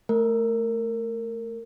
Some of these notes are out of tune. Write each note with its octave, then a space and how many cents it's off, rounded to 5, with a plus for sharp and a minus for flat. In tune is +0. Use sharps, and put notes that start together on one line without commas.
A3 +0 A#4 -20